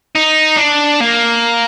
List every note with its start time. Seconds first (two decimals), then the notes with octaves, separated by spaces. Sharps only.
0.15 D#4
0.57 D4
1.01 A#3